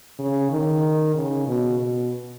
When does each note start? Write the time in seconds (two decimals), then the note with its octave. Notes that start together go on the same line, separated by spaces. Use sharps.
0.19 C#3
0.51 D#3
1.15 C#3
1.47 B2
1.79 B2